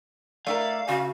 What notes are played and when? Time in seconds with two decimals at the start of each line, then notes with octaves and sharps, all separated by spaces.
0.47 A3 E4 A#4 D5 F5
0.89 C#3 F#4